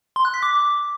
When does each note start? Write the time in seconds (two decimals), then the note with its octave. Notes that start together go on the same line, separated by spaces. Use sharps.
0.16 C6
0.25 F#6
0.34 B6
0.43 D6